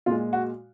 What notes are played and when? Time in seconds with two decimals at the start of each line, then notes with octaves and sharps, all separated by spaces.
0.06 A#2 G#3 F4
0.33 F#4